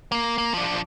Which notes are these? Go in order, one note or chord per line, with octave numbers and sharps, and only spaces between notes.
A#3
A#3
F3 D4